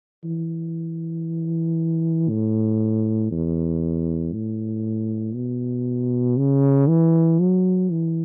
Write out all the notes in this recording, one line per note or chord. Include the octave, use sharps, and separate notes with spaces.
E3
A2
E2
A2
B2
C#3
E3
F#3
E3